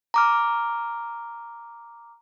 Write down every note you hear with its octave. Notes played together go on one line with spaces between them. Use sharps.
A#5 D6 F6